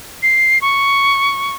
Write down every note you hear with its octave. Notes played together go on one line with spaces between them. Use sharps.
C7
C#6